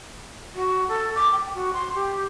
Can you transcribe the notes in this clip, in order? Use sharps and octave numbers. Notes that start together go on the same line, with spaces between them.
F#4
A4
D6
G5
F#4
C6
G4